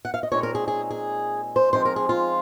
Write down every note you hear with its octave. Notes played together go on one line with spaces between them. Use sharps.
F#5
F5
D#5
A#2 G#3 C4 D#4 C#5
A#4
G#4
G#4
G#4
C5
F3 G#3 C4 D#4 C5
A#4
G#4
F4